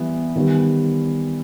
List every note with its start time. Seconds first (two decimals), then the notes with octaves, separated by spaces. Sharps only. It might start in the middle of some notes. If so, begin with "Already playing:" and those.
Already playing: E3 G3 B3
0.35 D#3 G3 B3